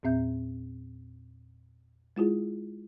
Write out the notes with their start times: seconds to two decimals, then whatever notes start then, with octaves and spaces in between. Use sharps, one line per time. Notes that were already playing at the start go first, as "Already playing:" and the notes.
0.03 E2 A#2 C4 E5 G6
2.16 G#3 E4 F4 G#4